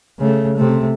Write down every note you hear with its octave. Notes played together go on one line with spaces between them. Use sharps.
C#3 A3
C3 A3